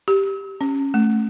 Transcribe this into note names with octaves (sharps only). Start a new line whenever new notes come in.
G4
C#4
A3